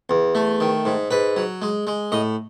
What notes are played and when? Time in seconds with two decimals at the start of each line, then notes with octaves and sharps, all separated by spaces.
0.09 E2
0.35 A3
0.60 D#3
0.85 G#2
1.11 G#2 B4
1.37 F#3
1.62 G#3
1.87 G#3
2.12 A2 D#5